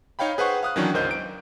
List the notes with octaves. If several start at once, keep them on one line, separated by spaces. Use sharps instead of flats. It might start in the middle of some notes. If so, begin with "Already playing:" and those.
D#4 C#5 F5 G5 B5
G#4 B4 C5 F#5 C#6
F5 D#6 F#6
D#3 E3 F#3 C#4 D4
G1 C#2 A#4 C5 D#5 G6
D7